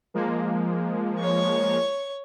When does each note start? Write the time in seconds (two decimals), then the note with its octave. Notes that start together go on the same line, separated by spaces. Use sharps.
0.14 F3 G#3 A#3
1.19 C#5 C#6